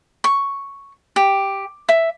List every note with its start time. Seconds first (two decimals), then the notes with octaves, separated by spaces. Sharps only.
0.24 C#6
1.16 G4
1.89 E5